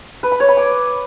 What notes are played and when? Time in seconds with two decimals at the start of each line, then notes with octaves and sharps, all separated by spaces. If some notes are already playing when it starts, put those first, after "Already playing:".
0.23 B4
0.32 B5
0.40 C#5
0.49 B5
0.57 D6